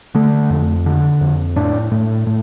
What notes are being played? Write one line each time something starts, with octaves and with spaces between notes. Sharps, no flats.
D3 A3
F2
D3
F2
A2 D4
A2
A2